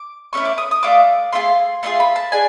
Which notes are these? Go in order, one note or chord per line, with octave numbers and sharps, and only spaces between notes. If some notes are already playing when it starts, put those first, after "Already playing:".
Already playing: D6
A3 C#4 E4 C#6
D6
D#6
D#6
A3 D4 F4 D6
A3 D4 F4 G#4 C6
A3 D4 F4 G#4 C6
B5
A5
D4 G#4 G#5